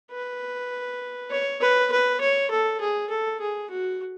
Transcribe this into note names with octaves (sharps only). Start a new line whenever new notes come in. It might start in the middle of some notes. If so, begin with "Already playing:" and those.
B4
C#5
B4
B4
C#5
A4
G#4
A4
G#4
F#4